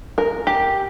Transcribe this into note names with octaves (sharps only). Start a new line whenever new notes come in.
A#4
G4